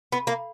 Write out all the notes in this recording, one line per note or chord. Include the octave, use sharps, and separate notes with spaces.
B3
A#3